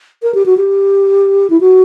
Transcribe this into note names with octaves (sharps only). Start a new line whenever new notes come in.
A#4
G4
F#4
G4
E4
F#4